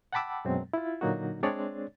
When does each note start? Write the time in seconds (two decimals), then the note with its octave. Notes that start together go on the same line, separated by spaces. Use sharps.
0.13 F#5 G5 A5 B5 D6 E6
0.45 F#2 B2 F#3 G#3 C4
0.74 E4 F4
1.01 A#2 D3 F#3 A#3 D#4 F#4
1.43 G#3 C4 D4 G#4 C#5 D5